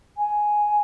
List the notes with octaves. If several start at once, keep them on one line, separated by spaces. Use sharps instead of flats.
G#5